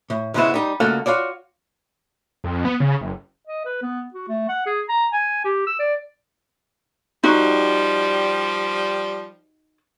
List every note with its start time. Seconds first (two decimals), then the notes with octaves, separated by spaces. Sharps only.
0.10 A2
0.34 G#2 C#3 G#3 B3 E4 F#4
0.54 G3 D#4
0.80 C#2 A3 A#3 F#4 F#5
1.06 F4 F#4 C#5 D5
2.44 F2
2.65 B3
2.80 C#3
3.01 F#1
3.47 D#5
3.65 B4
3.82 B3
4.14 F#4
4.28 A3
4.48 F#5
4.66 G#4
4.89 A#5
5.13 G#5
5.44 G4
5.67 E6
5.79 D5
7.23 F3 G3 D#4 F#4